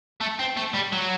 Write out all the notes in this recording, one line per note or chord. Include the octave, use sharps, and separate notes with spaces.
A3
C4
A3
G3
F#3